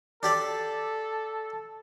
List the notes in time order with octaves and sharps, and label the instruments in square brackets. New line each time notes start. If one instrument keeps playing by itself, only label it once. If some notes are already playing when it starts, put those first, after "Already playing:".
[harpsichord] D4 G4 D5 [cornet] A4